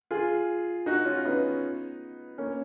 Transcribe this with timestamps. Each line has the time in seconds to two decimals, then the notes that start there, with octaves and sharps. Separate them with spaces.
0.11 F4 G#4
0.86 D#4 F#4
1.05 C#4 F4
1.25 B3 D#4
2.38 A#3 C#4